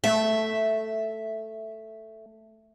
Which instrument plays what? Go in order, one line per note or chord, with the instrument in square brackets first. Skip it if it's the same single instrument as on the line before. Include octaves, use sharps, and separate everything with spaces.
[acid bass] A3 [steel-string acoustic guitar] E5